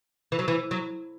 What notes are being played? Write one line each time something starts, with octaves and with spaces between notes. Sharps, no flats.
E3
F#3
E3
F#3